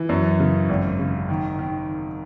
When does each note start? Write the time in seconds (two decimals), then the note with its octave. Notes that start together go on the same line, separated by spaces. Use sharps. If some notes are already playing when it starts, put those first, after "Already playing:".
Already playing: E3
0.09 F#2
0.40 C#3
0.69 G#1
0.99 C#3
1.29 D#3
1.59 D#3